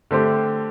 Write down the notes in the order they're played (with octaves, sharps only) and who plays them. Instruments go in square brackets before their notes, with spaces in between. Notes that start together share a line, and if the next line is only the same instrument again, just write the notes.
[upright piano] D3 A3 C4 G4 C5